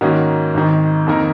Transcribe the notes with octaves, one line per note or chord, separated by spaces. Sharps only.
G#2 D#3 A#3 C#4 F#4
G#1 G#2 D#3
F2 D#3 A#3 D#4 A#4